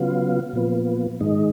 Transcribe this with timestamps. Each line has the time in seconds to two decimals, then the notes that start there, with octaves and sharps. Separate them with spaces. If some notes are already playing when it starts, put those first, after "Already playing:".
Already playing: C#3 F#3 B3 F4
0.53 A#2 F3 B3
1.21 G#2 D#3 G#3 D#4